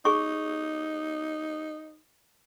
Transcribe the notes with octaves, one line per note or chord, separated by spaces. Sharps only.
D#4 G#4 C#6